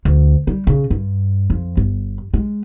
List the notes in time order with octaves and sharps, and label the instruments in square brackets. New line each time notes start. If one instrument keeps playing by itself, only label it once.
[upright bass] D2
G3
C#3
G2
F2
G1
G#3